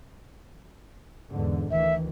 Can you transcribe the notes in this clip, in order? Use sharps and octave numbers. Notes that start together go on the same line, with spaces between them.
E2 G#2 D3
D2 D#3 E3 E5